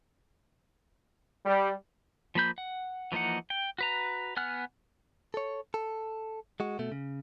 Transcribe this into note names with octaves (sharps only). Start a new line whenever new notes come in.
G3
F3 A#3 B5 G6
F#5
E3 F3 A#3 D#4 F#5
G5
F#4 B4 A#5
B3 F#5 G#5 F6 F#6
A4 C#5
A4
G#3 F#4
B2 A3
C#3